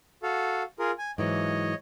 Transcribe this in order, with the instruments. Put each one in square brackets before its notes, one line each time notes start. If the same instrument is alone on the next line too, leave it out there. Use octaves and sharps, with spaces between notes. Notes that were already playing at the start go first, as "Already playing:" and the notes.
[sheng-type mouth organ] F#4 A4 F5
F4 G#4 A#4
G#5
[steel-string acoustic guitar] G#2 E3 F#3 [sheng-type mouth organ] C#5 D#5